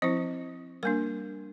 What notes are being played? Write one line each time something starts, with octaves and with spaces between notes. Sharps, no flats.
F3 C4 E4 C5
G3 A#3 D4 A#4